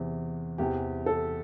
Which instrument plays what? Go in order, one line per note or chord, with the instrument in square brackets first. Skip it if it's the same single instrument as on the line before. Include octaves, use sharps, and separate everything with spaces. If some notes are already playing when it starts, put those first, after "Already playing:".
Already playing: [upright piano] E2 C3 E3
E2 C3 E3 G4
A4